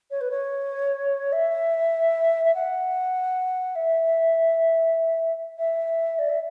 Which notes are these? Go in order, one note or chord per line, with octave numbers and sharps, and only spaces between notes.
C#5
B4
C#5
E5
E5
F#5
E5
E5
D5
E5